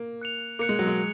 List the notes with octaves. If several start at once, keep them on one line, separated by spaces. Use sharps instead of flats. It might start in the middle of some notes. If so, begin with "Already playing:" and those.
Already playing: A#3
F#6 C#7 F7
A#3 F#6 C#7 F7
G#3
F#3
G#3